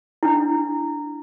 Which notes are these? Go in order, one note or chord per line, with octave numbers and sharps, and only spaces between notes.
D4 E4